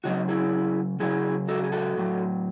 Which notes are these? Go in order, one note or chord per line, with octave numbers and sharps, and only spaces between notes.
C#3 F#3 D#4 F#4
E4 G#4
C#3 F#3 E4 G#4
F#4 A4
G#4
F#4 A4
A2 F#3